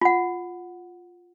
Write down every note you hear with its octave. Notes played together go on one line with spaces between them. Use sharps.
F4 F#5